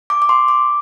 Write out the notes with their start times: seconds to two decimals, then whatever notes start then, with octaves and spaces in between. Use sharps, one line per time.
0.10 D6
0.22 D6
0.29 C6
0.48 D6